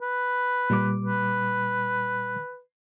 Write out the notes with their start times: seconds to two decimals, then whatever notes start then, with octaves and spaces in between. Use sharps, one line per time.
0.02 B4
0.70 A#2 G3 D6
1.05 B4